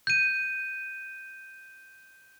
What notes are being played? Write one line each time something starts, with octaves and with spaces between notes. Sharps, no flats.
G6 D#7